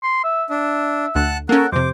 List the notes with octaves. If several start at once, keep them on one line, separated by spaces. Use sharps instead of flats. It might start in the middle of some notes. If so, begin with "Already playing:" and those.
C6
E5
D4 E5
D2 F#5 A5 F#6
A#3 C#4 A4 A#4 F#5
F2 C3 C5 D6